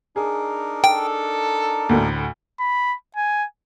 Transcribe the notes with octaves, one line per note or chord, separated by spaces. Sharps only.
D4 D#4 G#4 A#4
A4 G5
D2 A2
B5
G#5